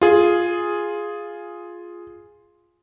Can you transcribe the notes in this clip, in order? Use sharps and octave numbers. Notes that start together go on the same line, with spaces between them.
F4 G#4